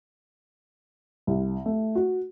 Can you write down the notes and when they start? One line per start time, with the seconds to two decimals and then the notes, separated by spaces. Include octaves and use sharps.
1.27 C2
1.66 A3
1.95 F#4